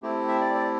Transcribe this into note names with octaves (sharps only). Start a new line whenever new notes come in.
A3 C4 E4 G4
E5
D5
D5